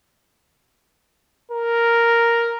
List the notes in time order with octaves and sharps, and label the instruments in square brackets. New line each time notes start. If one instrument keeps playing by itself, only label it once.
[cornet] A#4